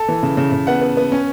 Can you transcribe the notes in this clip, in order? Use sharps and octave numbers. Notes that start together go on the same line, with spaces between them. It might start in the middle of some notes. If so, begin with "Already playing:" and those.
Already playing: A4
E3
C#3
C#3
C#3
B3 F#5
B3
B3
C#4